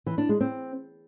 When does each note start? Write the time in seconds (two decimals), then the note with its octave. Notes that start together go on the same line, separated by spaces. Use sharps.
0.06 E3
0.18 D4
0.29 G#3
0.40 C4